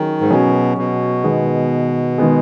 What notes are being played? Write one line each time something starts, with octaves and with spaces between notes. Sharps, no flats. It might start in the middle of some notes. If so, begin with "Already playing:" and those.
Already playing: D#3 F#3 C#4 G#4
G#2
B2 F#3 C#4 G#4
B2
D#3 G#3 B3 G#4
D#3 G#3 B3 G#4